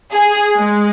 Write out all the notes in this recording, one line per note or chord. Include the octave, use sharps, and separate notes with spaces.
G#4
G#3